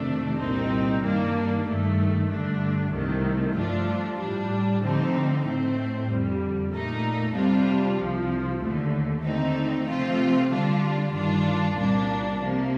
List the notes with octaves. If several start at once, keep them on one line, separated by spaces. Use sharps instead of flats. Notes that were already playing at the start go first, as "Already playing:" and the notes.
Already playing: F2 C3 D#3 A3 D4
C2 A#2 G3 C4 D#4
G2 D#3 G3 A#3 D4
G2 D#3 A3
G2 D3 A3 D4
C2 C3 D#3 A3
G2 F3 A3 D4 F4
A2 G3 D4
D3 F3 A3 C4 D#4
A2 A3 C4
F2 D3 G3
A#2 A3 D#4
C3 G3 D4 F4
C2 C3 F3
D#2 D3 A3
D3 A3 C4 D#4
C3 F3 A3 C4 F4
D3 G3 D4 F4
G2 D#3 G3 D4 F4
C2 A#2 G3 A#3 D4
C3 F3 A#3